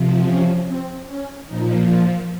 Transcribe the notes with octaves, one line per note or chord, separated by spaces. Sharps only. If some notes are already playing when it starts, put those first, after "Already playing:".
Already playing: C3 F3
C#4
C4
C#4
A#2 F3 D#4
F4